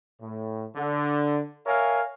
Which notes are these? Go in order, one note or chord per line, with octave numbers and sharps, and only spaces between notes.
A2
D3
A#4 C#5 E5 F5 G#5